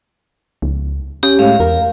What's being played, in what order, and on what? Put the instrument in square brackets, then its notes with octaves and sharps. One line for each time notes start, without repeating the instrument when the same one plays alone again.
[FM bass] C#2
[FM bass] C#4 [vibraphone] G4
[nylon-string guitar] A2 G#3 [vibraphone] F5
[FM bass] E2 [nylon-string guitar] A#4